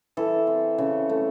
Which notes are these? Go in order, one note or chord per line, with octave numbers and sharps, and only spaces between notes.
E3 A4
C4
C#3
A3